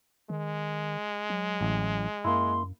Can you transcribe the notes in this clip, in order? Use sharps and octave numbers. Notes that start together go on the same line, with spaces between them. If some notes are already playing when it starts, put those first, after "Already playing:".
D#3 G#3
F#3
A1
F#2 A#3 E4 C6